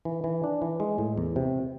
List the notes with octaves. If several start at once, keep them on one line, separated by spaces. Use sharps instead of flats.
E3
E3
D4
E3
G#3
A2
E2
C3